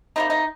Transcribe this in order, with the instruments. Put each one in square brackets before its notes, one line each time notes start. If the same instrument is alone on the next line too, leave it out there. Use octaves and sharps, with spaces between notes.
[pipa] C3 G3 A#3 D#4
D#4